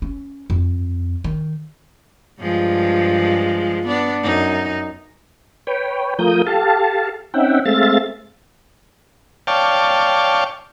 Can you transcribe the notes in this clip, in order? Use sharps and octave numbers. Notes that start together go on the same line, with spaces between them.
C#4
F2
D#3
G2 F3 G#3
B3 D4
F#2 D#4
B4 C#5 G5
F3 A3 F4 A#4 D#6 G6
G4 A4 F5 A5
C4 C#4 D#4 E5 F#5 G5
G#3 A3 C4 E5 F5 A6
C#5 D5 F5 G5 A5